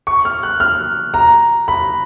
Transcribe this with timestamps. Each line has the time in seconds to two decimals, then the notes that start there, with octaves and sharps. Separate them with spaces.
0.07 C#6
0.25 F6
0.43 F#6
0.60 F6
1.14 A#5
1.68 B5